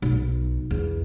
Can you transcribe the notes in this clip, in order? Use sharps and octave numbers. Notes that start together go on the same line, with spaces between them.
B1
E2